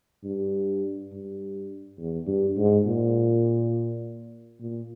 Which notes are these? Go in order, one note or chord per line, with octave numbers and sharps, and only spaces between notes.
G2
G2
E2
G2
G#2
A#2
A#2